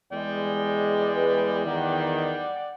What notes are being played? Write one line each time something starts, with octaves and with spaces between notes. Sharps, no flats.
E2 G#3 D5 G5
B4
D#3 F#5